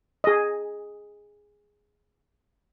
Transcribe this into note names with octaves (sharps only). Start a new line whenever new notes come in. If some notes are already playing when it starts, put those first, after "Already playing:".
G#4 D#5